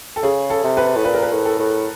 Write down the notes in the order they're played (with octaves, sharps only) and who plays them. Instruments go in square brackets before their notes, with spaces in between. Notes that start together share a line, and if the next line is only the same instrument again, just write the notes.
[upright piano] A4
[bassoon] C#3 [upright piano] G#4
[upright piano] A4
[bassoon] C3
[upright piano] B4
[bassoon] A2
[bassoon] A#2 [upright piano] B4
[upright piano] A#4
B4
[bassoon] A2
[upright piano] A4
[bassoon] A2